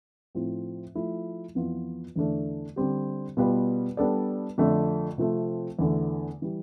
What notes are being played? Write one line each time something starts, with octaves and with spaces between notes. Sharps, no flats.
A2 F3 C4
F3 A3 E4
F2 E3 B3 F4
E2 D3 A3 D4
D3 G3 C4 G4
B2 G3 B3 F4 B4
G3 B3 D4 A4 D5
F2 D3 A3 D4
C3 F3 A3 C4
E2 D3 A3
E3 G3